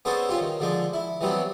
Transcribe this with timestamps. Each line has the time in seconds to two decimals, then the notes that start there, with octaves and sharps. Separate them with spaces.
0.05 B3 C#4 D4 G#4 A4 C5
0.29 C#4 F4 G4
0.41 D#3
0.60 D3 F3 G#3 D4
0.93 E4
1.21 E3 F#3 G3 B3 C4